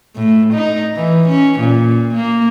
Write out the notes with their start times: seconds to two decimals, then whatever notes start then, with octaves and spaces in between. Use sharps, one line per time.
0.16 A2
0.54 D#4
0.96 E3
1.29 C#4
1.60 A#2
2.14 A#3